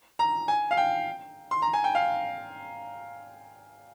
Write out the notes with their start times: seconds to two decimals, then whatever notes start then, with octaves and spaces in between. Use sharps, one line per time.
0.19 A#5
0.48 G#5
0.71 F5
0.77 G5
1.51 C6
1.62 A#5
1.73 G#5
1.84 G5
1.95 F5